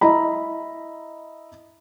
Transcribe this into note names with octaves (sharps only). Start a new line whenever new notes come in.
E4 D#5 A#5 B5